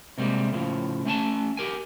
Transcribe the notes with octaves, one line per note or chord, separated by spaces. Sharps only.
C3 G3 G#3 A#3
A2 C#3 F3
A3 C#4 G#5 A5
G4 A#4 G#5